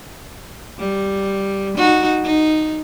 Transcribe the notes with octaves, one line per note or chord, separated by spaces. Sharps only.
G3
D#4 F#4
D#4